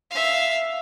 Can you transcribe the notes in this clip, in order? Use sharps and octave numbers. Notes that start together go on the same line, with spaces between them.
E5 F5